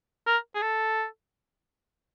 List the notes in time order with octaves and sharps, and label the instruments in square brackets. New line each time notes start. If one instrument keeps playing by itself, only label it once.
[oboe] A#4
G#4
A4